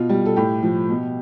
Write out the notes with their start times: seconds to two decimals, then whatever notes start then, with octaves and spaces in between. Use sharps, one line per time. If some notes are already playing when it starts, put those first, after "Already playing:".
Already playing: B2 F4
0.09 G3
0.26 A4
0.36 A2 G4
0.63 F3
0.89 B2